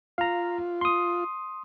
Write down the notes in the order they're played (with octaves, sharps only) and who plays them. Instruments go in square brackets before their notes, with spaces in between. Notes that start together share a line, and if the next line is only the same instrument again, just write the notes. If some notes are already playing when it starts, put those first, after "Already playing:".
[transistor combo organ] F4 [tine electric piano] F5 A#5
[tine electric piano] C6 D#6